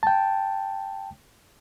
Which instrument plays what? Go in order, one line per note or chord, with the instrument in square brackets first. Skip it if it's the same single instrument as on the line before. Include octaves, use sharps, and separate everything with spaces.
[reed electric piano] G5 A5